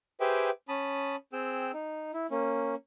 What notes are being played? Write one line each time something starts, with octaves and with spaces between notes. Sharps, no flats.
G4 G#4 B4 C5 E5 G5
C#4 A5 B5 D#6
C4 G#4 G5 E6
D#4
E4
A#3 C#4